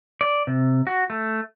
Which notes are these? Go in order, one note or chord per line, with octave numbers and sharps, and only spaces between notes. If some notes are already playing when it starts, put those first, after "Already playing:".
D5
C3
F#4
A3